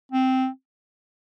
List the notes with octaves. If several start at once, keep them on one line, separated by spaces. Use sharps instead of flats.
C4